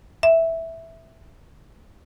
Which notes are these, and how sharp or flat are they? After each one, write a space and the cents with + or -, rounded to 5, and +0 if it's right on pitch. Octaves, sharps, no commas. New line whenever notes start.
E5 -5